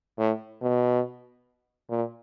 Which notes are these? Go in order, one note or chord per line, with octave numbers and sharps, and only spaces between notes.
A2
B2
A#2